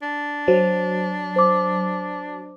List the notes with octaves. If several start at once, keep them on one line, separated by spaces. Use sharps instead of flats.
D4
F#3 C5
C5 D6